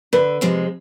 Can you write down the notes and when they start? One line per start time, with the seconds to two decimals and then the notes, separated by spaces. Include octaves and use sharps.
0.13 D3 B4
0.41 C3 F3 G#3